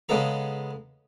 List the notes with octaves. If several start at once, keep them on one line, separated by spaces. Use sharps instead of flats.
C#3 G#3 B3 A4 A#5